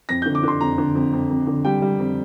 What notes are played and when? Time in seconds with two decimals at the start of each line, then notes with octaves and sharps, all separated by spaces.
0.09 F2 A#6
0.22 D3 G6
0.35 D6
0.43 D3 C6
0.61 F2 A#5
0.78 D3
0.95 F2
1.13 F2
1.30 F2
1.47 D3
1.65 G3 G5
1.82 G3
1.99 F2